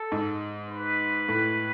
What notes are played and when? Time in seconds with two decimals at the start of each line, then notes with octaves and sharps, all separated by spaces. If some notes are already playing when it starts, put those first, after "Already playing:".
Already playing: A4
0.12 G#2
0.70 B4
1.28 A2